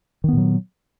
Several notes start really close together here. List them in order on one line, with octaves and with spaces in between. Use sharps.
D#3 B3 A#2 F#3